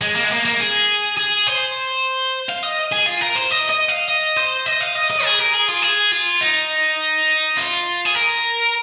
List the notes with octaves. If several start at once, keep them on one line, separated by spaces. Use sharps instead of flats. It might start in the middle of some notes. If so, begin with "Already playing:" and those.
G#3
A#3
G#3
A#3
A#3
G#4
G#4
C5
F5
D#5
G#4
F4
A#4
C5
D#5
D#5
F5
D#5
C5
D#5
F5
D#5
D#5
G#4
A#4
G#4
F4
G#4
F4
D#4
F4
G#4
A#4